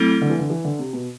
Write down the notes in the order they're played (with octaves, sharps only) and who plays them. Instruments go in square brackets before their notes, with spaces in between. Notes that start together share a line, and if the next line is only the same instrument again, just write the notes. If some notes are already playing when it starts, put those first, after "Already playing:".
Already playing: [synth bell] F#3 A3 C4 E4 A4
[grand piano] D3
E3
D3
E3
D3
C3
B2